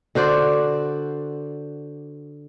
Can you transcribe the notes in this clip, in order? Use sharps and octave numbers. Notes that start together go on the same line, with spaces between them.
D3 F#4 C5 D5